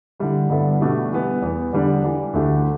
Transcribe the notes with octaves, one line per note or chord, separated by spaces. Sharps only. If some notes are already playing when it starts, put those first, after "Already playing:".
D3 G3 E4
G2 D3 B3 E4 A4
B2 A3 D4 G4
E3 G3 B3
E2 E3 B3
E2 D3 G3 D4
E3 G3 D4
D2 D3 A3 E4 G4